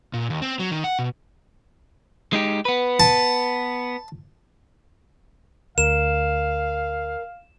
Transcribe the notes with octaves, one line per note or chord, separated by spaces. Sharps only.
A#2
D#2
C4
F#3
D#3
F#5
B2
G#3 D#4 G4
B3 B4
A5
D2 A#4 F5 E7